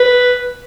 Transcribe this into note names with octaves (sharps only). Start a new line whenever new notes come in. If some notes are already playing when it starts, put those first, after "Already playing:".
Already playing: B4